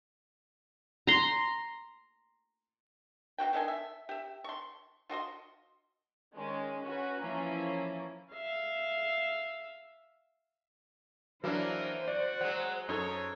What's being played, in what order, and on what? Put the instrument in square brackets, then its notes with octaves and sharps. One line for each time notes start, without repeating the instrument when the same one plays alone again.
[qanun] A#5 C6
[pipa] B2 F4 F#4 G5
D3 D#3 D#5 G#5
E5
G4 E5
C6 C#6
F4 F#4 D#5 C6
[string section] D#3 G#3 C#4
C#4 F#4 B4
E3 F3 A#3 C#4 E4
[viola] E5 F5
[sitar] E3 A#3 [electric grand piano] F#3 D4 [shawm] A#4 [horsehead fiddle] C5
[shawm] F#4 [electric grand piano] D5
[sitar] F#3 G#3 [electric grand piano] F#5
[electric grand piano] F#2 A4 [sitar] D#4 [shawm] C#5